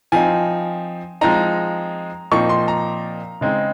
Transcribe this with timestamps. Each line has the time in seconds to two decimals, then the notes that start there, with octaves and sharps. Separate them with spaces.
0.12 F3 C4 D#4 G#5
1.21 F3 G#3 C4 D#4 A#5
2.31 A#2 F3 C4 D#4 C#6
2.49 C6
2.68 A#5
3.41 C#3 G#3 C4 D#4